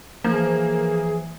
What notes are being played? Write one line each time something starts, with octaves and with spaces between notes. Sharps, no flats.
E3 F3 A#3 G#4